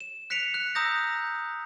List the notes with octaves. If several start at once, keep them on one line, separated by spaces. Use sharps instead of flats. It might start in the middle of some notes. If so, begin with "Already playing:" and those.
E7
F#6 B6 C#7 D7 F7
F#6
A#5 D#6 E6 G6 A#6